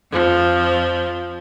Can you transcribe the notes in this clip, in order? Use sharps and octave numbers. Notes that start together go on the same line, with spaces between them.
F2 F3